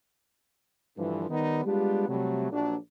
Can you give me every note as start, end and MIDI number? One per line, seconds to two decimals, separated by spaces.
0.98 1.27 43
0.98 1.27 50
0.98 1.27 52
0.98 1.27 53
1.30 1.64 51
1.30 1.64 55
1.30 1.64 59
1.30 1.64 63
1.65 2.05 55
1.65 2.05 56
1.65 2.05 59
1.65 2.05 62
1.65 2.05 65
1.65 2.05 67
2.09 2.49 48
2.09 2.49 54
2.09 2.49 55
2.09 2.49 57
2.51 2.76 34
2.51 2.76 54
2.51 2.76 62